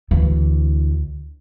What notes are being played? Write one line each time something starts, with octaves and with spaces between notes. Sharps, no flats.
D2 E3